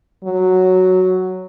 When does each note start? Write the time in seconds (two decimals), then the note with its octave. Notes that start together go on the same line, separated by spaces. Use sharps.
0.25 F#3